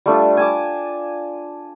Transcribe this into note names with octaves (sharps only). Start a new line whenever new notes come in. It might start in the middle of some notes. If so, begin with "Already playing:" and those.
G3 A3 D4 F4
G#5 A5 D6